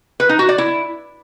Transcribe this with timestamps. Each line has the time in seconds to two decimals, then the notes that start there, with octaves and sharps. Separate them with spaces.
0.20 B4
0.29 D#4
0.39 F#4
0.49 D5
0.58 E4